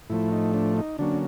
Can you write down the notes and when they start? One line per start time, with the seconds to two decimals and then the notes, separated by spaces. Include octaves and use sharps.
0.10 A2 F3 A3 E4
0.32 D#4
0.54 D4
0.77 D#4
0.98 D3 F#3 A#3 C#4 D4